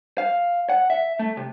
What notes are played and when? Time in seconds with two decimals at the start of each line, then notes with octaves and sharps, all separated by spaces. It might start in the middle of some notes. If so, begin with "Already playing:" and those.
0.18 F5
0.69 F#5
0.90 E5
1.19 A3
1.37 C3